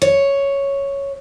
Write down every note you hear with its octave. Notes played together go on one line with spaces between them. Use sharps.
C#5